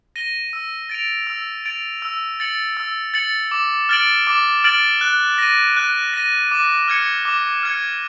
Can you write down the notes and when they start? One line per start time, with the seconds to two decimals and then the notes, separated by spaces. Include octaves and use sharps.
0.16 A#6 D#7 G7
0.53 E6
0.89 A6 D7 F7
1.27 E6
1.65 A6 D7 F7
2.02 E6
2.40 A6 C#7 F#7
2.77 E6
3.14 A6 C#7 F#7
3.51 D6
3.89 F6 A6 D7 F#7
4.27 D6
4.64 F6 A6 D7 F#7
5.01 F#6
5.38 A#6 D#7
5.77 F#6
6.14 A#6 D#7
6.51 D6
6.88 F6 G#6 C#7
7.25 D6
7.63 F6 G#6 C#7